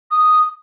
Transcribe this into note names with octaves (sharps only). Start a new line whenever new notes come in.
D#6